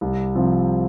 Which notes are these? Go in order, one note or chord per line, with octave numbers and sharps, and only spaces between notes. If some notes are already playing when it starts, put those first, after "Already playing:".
C2
C3 F3 C4